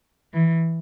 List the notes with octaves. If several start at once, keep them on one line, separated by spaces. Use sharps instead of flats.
E3